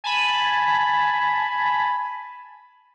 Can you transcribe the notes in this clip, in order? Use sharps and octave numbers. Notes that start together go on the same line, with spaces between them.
G#5 A5 B5